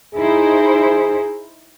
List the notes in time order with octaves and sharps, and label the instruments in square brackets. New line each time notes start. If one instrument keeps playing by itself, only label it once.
[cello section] D#4 E4 C5 [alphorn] G#4